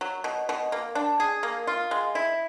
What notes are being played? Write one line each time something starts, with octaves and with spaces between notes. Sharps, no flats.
F#3
B2
B2
A#3
D4
G#4
A#3
F4
G#3
E4